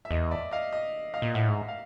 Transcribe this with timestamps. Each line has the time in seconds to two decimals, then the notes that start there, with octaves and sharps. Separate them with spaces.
0.05 E5
0.11 E2 D#5
0.31 D5 E5
0.51 D#5 F5
0.72 D#5
1.14 D#5 F5
1.22 A#2
1.34 A2 E5 F#5
1.48 G#2
1.68 F5